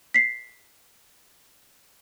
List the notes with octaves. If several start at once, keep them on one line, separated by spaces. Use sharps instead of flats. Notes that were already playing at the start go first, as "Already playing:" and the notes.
B6 C7